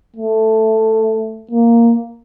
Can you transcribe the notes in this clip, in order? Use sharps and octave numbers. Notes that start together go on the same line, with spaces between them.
A3
A#3